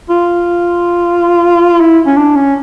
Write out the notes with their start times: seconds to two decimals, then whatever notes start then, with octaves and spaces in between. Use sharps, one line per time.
0.10 F4
1.80 E4
2.07 C#4
2.17 D4
2.36 C#4